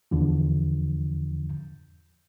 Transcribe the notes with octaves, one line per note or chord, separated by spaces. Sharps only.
E2 D3 F3